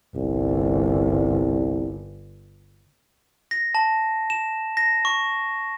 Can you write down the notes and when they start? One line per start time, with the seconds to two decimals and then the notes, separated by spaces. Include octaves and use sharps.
0.15 G1 C2
3.51 A#6
3.75 A5
4.30 E7
4.77 A#6
5.05 C#6